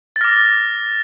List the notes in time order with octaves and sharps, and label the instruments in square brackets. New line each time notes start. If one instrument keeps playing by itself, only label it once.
[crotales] A6
D6 F6 A#6